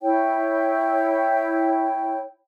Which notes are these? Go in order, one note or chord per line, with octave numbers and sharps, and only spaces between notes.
E4 C#5 G5